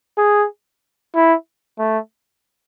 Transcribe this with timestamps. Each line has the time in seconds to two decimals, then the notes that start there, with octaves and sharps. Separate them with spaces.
0.18 G#4
1.15 E4
1.79 A3